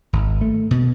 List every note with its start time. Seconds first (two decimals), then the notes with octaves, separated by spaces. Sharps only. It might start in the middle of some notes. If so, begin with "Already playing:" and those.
0.13 G#1
0.41 A3
0.71 B2